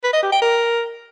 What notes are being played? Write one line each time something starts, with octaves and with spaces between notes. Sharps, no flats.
B4
D#5
G4
G5
A#4